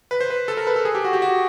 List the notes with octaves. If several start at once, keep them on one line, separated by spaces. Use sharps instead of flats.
B4
C5
B4
A4
A#4
B4
A4
G#4
G4
F#4
G4
F#4